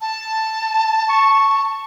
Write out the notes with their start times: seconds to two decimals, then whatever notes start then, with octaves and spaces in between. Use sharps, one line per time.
0.01 A5
1.10 C#6